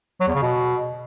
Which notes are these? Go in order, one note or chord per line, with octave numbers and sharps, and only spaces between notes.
F#3
E2
C#3
B2